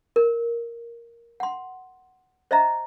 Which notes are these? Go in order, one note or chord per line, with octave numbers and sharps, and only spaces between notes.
A#4
F#5 C6
C5 D#5 E5 A#5